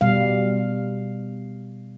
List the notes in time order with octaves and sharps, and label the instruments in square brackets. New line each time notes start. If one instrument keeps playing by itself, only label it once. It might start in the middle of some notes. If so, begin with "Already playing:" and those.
[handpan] B2 G3 F5